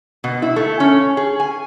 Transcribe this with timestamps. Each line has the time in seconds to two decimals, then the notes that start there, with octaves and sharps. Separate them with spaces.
0.24 B2
0.42 E4
0.56 A3
0.80 C#4
1.17 G#4
1.40 G#5